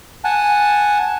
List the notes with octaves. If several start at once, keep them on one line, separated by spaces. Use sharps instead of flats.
F#5 G#5 A5